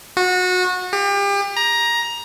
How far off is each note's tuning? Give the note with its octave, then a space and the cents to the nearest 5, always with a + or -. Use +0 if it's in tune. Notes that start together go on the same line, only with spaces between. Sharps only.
F#4 -25
G4 +35
A#5 +15